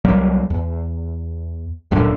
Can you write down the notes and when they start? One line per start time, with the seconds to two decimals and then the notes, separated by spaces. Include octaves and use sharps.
0.05 C2 F#3 G3 A#3
0.50 E2
1.91 D1 F#2 A#2 D3